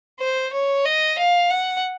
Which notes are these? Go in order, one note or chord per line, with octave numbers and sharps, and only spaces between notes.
C5
C#5
D#5
F5
F#5